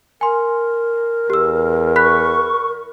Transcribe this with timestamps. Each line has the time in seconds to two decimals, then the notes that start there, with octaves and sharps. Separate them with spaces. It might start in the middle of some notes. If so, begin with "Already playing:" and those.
0.21 A#4 G#5 C6
1.30 E2 G4 E6
1.96 B5 C#6 F#6 B6